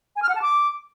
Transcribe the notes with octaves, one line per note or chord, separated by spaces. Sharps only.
G#5
F6
F#5
A5
D6